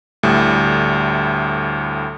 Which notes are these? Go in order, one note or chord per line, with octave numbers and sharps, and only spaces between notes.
D2 A2 G3